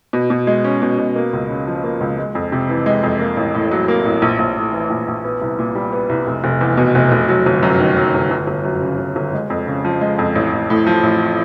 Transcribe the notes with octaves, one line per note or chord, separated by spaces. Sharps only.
B2
B2
G#3
C#4
B2
B2
A#3
C#2
C#3
F3
A#3
C#2
G#3
F2
C3
E3
G#3
F2
A#3
A1
A2
F#3
A#3
A1
A#1
A#1
A2
E3
A#1
A#1
B3
C2
A#2
G3
B3
C2
F1
F1
E2
B2
F1
F1
F#3
G1
F#2
D#3
F#3
G1
G1
G1
F#2
C#3
G1
G1
G#3
F2
C#3
F3
G#3
F2
A1
A1
A2
F3
A1